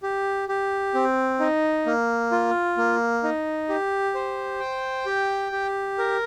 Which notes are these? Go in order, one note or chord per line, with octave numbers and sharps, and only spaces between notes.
G4
G4
C4
D#4
A#3
F4
A#3
D#4
G4
C5
G5
G4
G4
A#4